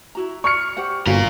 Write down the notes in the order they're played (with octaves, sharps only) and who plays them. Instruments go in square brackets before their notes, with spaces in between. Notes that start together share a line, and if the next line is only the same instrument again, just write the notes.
[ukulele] E4 F#4 A#5
[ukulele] D5 [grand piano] C#6 F6 C#7
[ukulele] G4 C5 F#5
[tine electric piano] G1 [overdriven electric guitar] F4 A#4 [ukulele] F#4